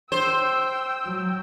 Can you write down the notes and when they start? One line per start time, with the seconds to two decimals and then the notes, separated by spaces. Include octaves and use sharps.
0.12 C5 G5 E6
1.07 F#3